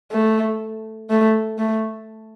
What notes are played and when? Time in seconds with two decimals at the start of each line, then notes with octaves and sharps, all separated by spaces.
0.12 A3
1.10 A3
1.58 A3